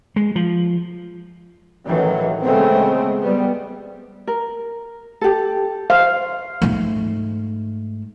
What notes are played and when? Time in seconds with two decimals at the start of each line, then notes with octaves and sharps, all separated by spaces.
0.16 G#3
0.36 F3
1.86 A1 D#3 E3 F#3
2.42 C#3 G#3 A3 B3 C4
3.20 G3 B3
4.27 A#4
5.21 G4 A4
5.90 C5 F5
6.62 G#2 A3